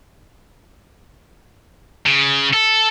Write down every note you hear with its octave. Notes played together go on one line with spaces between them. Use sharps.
C#3
A4